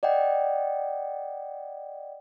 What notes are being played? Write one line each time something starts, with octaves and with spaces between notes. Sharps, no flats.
D5 D#5 F#5 G5